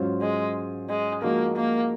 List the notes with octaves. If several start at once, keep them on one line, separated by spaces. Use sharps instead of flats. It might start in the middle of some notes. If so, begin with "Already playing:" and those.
Already playing: G#2 F#3 C#4 F4 C5
G#3
G#3
F3 G#3 A#3 D#4 F#4 A#4
A#3